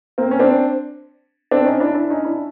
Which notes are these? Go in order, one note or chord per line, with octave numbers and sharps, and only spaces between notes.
A#3 C4
C#4
C4 D4
C4 D4
C#4 D#4
D4 E4
D4 E4
C#4 D#4
D4 E4